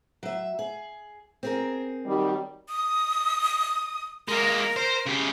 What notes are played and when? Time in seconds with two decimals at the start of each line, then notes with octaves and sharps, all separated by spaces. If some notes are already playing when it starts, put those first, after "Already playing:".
0.23 F#3 E5
0.59 G#4
1.43 C4 G#4 A#4
2.05 D#3 F#3 G3
2.69 D#6
4.28 G#3 A#3 A#4
4.76 C5
5.06 C#3 G4